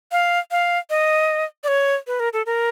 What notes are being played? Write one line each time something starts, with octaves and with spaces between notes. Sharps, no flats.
F5
F5
D#5
D5
C#5
B4
A#4
A4
A#4